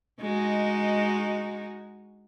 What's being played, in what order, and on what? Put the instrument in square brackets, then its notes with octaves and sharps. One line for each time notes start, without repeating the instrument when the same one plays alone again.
[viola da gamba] G#3 D#4 F#4